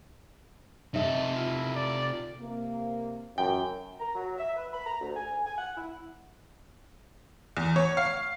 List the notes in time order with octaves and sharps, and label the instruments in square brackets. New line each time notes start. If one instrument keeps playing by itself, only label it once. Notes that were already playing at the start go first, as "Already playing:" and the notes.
[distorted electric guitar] C3 A4 [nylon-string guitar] D#4 E5
[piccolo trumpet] E4 [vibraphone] F4
[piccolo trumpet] D5
[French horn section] C3 A#3
[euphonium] F#2 [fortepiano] G5
[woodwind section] A#5
F#3
E5
B4
B5
A#5
D2
G#5
G#5
F#5
E4
[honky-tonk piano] E2
C#5
F5